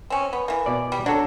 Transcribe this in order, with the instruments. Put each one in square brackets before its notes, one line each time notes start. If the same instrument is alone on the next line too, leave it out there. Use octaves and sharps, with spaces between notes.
[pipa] C4 C#4
B3
E3 A#3
[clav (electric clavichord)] B2 D5
[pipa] G3
[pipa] F#3 [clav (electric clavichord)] D4 A4